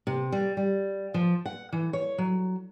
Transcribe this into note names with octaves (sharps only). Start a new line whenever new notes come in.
C3
G3
G3
F3
F#5
E3
C#5
F#3